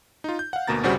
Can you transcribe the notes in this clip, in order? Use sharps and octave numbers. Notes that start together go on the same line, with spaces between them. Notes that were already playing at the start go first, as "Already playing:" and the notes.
D#4 F4
G6
F5 F#5
D2 B2 A#3 A#5 A6
G1 C2 C#3 G3 F#4 C5